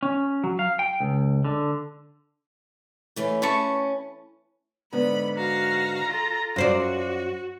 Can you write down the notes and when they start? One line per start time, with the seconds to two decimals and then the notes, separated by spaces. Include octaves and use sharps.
0.03 C#4
0.44 F#3
0.59 F5
0.79 G5
1.00 C#2
1.45 D3
3.16 E3 A3 C#4
3.42 C#4 B4 A5 C#6
4.93 G#2 D3 B3 B5
5.36 F#4 F5 A#5
6.08 F4 A4
6.56 F#2 F4 F#4 C5 D5